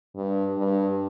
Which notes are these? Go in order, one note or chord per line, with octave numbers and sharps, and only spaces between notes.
G2
G2